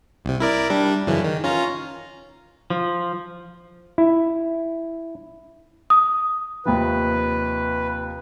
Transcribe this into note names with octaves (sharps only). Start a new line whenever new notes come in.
C2 C3
E4 A#4 D5
G3 D4
F#2 C#3 E3
D#3
C#4 F4 A#5
F3
E4
D#6
D#2 C3 F3 B4